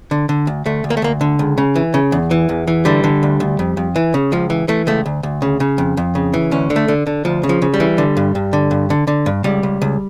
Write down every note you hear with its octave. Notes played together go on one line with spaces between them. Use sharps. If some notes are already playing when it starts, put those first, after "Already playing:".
D3
D3
D2
D2 A3
D2
A#3
A3
D2 A#3
D3
C#2
C#3
E3
C#3
E2
E3
E2
E3
D3 G3
D3
D2
D2
F2
F2
E3
C#3
C#2 F3
E3
E3 A3
C#2 A3
D2
D2
C#3
C#3
F2
F2
C#3
E3
D2 C#4
D3
A3
D3
D3
D2 F3
C#3
F3
C#3
G3
E3
D3
G2
G2
D3
G2
D3
D3
G2
C#2 G3
C#2
C#2